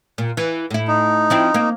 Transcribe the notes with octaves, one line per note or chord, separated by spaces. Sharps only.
A#2
E3
A2 E4
D#4
F3 C4 E4
A#3